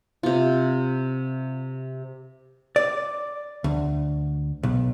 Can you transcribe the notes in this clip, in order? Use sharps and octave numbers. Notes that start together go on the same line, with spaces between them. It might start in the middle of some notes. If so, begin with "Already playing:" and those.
C3 F4
D5
D2
B1